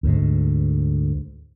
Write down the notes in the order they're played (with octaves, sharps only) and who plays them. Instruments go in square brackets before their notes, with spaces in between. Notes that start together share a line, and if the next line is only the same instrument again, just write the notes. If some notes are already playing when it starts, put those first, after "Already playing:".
[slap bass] D2 G#2